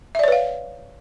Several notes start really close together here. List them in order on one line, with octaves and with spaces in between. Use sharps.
E5 D5 C#5 B4 F5